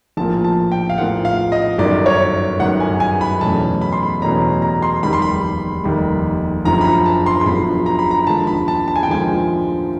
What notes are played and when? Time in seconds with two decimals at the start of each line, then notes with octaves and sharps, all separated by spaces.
0.17 A#1 A2 F3 A#3 A5
0.44 A5
0.72 G5
0.90 F5
0.98 A#1 A2 F3 A#3 F#5
1.25 F5
1.52 D#5
1.78 G1 F#2 D#3 D5
2.06 C#5
2.60 G1 F#2 D#3 F#5
2.80 G#5
3.00 G#5
3.21 B5
3.41 E2 B2 F#3 A3 C#4 A5
3.82 B5
3.93 C6
4.03 B5
4.22 E2 B2 F#3 A3 C#4 A#5
4.62 A#5
4.83 C6
5.03 F1 D#2 D#3 G3 B5
5.13 C6
5.22 B5
5.84 F1 D#2 D#3 G3
6.65 F#1 F#2 D3 F3 A#5
6.81 B5
6.85 A#5
7.06 A5
7.26 C6
7.41 C6
7.46 F#1 F#2 D3 F3 B5
7.86 A#5
7.99 B5
8.11 A#5
8.27 D#2 D3 F3 G#3 A5
8.47 B5
8.68 A5
8.88 A5
8.96 G#5
9.03 G5
9.07 D#2 D3 F3 G#3 G#5